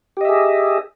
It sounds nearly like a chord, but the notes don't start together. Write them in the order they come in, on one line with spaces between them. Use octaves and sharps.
G4 D#5 E5 G#4